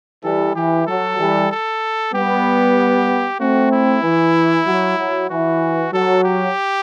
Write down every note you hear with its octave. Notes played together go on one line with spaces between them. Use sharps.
E3 G3 A4
E3 G4
F#3 A4
E3 G3
A4
G3 B3 G4
A3 C4 F#4
E4
E3
F#3
F#3
E3 F#4
F#3 A4
G4